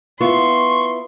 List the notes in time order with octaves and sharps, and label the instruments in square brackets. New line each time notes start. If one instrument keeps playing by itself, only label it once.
[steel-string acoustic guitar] B3 E4 F4 [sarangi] C6 [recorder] C#6